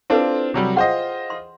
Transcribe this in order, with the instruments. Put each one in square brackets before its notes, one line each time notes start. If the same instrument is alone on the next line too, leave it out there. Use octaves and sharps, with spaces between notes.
[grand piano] C4 D4 F4 [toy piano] E4 A4 B4
[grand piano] C3 F#3 G3
[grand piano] F4 C5 D#5 [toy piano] G#4 F#5 G5
[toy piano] C6